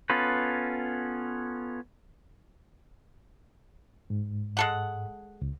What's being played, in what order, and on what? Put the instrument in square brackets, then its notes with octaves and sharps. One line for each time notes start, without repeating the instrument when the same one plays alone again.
[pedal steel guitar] B3 C#4 F4 A4 B4
[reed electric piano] G#2
[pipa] G#3 A4 F#5
[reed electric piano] C#2